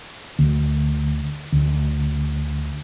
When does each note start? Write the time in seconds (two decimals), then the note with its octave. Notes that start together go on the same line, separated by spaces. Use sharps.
0.39 D2
1.52 D2